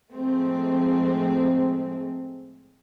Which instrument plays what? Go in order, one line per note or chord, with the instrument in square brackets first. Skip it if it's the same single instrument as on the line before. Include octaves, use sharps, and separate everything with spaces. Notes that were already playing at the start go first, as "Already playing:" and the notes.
[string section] A2 F3 G#3 A3 C4